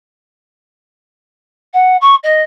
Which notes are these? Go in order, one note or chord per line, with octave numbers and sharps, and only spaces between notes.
F#5
C#6
D#5